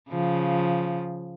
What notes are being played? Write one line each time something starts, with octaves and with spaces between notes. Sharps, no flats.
C#3 F3